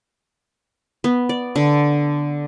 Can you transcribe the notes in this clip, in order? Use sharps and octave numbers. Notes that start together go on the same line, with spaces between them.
B3
D5
D3